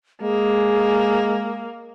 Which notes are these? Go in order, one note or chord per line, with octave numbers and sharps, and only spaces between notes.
G#3 A#3 G#4